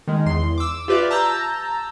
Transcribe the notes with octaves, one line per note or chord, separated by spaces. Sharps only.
D#3 G#3
E2 C6
D6 E6
F4 G4 B4 D5 E5
A5 A#5 E6 G6